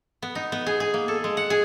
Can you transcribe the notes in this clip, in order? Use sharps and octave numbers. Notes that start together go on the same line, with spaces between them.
B3
D#4
B3
G#4
G#4
A#3
A4
G#3
F#5
G#4